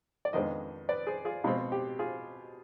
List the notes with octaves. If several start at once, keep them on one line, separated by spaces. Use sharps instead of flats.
D5
F2 D#3 G#3 B3 D4 C5 D#5
B4 D5
G#4 C5
F4 G#4
B2 G#3 C4 F4
G4
F4 G#4